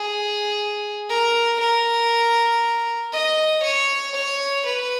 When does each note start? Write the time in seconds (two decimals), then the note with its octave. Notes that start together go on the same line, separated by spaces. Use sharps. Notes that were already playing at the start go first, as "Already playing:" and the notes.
Already playing: G#4
1.09 A#4
1.60 A#4
3.13 D#5
3.63 C#5
4.15 C#5
4.65 B4